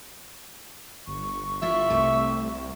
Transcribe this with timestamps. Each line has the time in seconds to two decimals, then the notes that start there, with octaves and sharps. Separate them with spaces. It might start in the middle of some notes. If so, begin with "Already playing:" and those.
1.07 G1 C#6
1.62 E4 F4 E5
1.90 C2 C3 A3